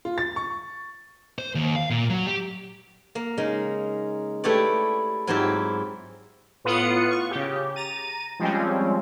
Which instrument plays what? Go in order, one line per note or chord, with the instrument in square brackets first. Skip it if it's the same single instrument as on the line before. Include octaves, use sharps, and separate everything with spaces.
[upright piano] F4
A6
C#6
[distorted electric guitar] C5
D#2
F5
A#2
F#3
G4
[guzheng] A#3
C#3 G#3 D#4
A3 E4 G4 B4 C#5 D5
G#2 F#3 C4 E4 F4 G4
[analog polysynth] A2 B3 F4 F#5 D#6 C#7
C#6
C#3 G4
A#5 A6 D#7
F3 G3 G#3 C4 C#4